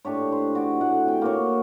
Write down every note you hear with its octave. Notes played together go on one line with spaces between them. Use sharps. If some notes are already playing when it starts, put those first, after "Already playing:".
A2 D4 G4 C#5
C5
F#4 D5
A2 F#5
C3 G5
A#3 F#4 C#5